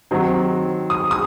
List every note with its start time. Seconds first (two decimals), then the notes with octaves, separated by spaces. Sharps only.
0.11 D#3 F#3 C4 D#4
0.90 D#6
1.11 D#6